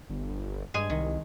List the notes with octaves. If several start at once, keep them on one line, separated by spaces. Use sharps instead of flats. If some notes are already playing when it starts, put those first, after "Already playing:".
G1
G2 G#3 G#4 G#5
C2 D#3